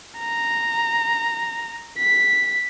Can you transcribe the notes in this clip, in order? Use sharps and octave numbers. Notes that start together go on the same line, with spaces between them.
A#5
B6